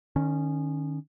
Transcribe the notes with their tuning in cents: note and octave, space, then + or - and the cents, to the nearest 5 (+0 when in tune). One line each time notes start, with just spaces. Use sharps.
D#3 -30 C#4 +0